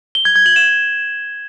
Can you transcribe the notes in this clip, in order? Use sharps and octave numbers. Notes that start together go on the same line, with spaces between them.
G7
G#6
G#6
F#7
E7